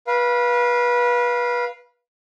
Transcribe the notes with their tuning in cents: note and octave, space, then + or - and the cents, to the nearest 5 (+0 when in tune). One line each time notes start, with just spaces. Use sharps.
B4 -25 F5 +0